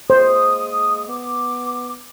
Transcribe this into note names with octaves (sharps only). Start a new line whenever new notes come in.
G#3 A#3 C5 D#6
B3 D6